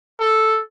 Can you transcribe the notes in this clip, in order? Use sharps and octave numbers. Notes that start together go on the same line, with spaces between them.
A4